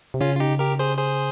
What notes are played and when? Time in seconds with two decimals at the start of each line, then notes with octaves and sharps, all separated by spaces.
0.14 C3
0.21 C#3 C#4 F4
0.35 F4
0.40 D#4 G4
0.59 G4 A#4
0.79 G#4 C5
0.98 G#4 C5